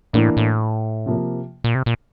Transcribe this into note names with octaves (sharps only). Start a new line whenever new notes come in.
A2 E3 A#3 D4
A2
C3 F3 A#3
A#2
C3
A#2